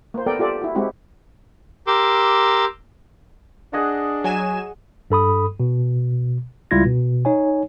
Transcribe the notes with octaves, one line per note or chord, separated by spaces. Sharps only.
A#3 C5
B3 A4 A#4 D5 G5
F4 G4 A4 D5
E4 F#4
G#3 C4 E4 F#4 G4
G4 A#4 C6 D6 E6
D4 G#4 D#5 F#5
F#3 G#5 E7
G2 A4 B5 D#6
B2
C#2 G3 E4 F4 G#6 A#6
B2
D#4 C#5 G#5